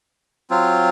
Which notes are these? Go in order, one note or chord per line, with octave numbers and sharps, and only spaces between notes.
F#3 C4 F4